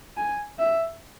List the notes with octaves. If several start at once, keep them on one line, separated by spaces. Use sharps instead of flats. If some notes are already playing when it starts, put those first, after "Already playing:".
G#5
E5